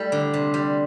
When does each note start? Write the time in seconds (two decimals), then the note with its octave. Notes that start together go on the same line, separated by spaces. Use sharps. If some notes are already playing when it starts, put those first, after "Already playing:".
Already playing: G3 A3 E4
0.12 D3
0.34 C3
0.54 G3